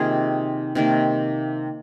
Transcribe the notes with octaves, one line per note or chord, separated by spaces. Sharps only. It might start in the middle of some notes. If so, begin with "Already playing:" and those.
Already playing: C3 D#3 A#3 F4 G#4
C3 D#3 A#3